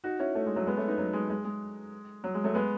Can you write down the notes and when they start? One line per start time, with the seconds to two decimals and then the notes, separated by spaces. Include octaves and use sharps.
0.04 D#4 F#4
0.19 C#4 E4
0.35 A3 C#4
0.46 G#3
0.56 F#3 A3
0.66 G#3 B3
0.77 A3 C#4
0.88 B3 D#4
0.98 F#3
1.13 G#3
1.29 G#3
1.44 G#3
2.24 F#3
2.34 G#3
2.44 F#3 A3
2.54 G#3 B3